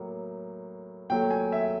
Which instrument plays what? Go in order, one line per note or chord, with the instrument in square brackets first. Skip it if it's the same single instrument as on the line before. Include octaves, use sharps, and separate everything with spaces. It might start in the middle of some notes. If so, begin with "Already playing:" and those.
Already playing: [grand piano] A2 F#3 A#3
A#2 F#3 A3 G5
G#5
E5